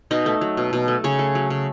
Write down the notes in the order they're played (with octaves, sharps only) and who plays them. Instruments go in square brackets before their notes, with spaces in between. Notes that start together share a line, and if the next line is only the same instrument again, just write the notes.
[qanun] B2 D#4
A3
F#3
B2
B2
A3
C#3 C#5
A3
F#3
C#3